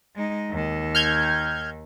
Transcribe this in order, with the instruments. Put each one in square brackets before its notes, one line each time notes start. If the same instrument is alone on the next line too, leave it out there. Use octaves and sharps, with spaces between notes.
[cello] G#3 D#4
D#2 D#3
[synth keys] F6 G6 G#6